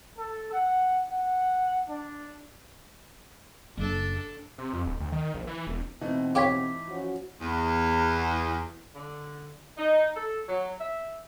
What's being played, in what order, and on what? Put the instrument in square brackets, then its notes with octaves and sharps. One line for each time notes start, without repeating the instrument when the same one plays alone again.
[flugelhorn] A4
F#5
F#5
D4
[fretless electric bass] F#1 [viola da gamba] D4 A4
[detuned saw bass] C3
F2
D1
D2
D#3
A#1
E3
E1
[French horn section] B2 C4 [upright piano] E3 A3 D#4
[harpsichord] F4 G4 C#5 [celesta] D6 B6
[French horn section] F3 C#4 F#4
[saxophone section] E2
[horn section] D3
D#4
A4
F#3
E5